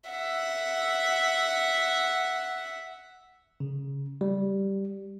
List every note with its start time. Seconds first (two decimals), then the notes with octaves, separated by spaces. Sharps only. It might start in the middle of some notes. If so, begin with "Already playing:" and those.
0.10 E5 F#5
3.60 C#3
4.21 G3